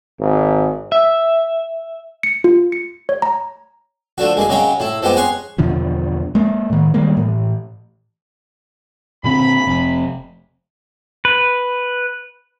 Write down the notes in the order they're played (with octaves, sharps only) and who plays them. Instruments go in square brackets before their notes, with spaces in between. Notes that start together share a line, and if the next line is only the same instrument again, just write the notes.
[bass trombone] G#1
[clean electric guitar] E5
[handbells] C#7
F4
C#7
C#5
A#5
[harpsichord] F3 A3 D4 F#4
G#3 A#3 G#4
C#3 F#3 G#3 C#5 G5
A2 E4
F3 G#3 B3 G4 D#5
G#4 C#5 F#5 C6 C#6
[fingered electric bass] E2 B2 D3 F3
G#3 A#3
A2 D#3
D#3 G3 G#3 A#3
A2 E3
[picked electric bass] A#2 D3 C4 [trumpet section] B5
[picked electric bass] F1 F2 C3
[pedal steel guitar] B4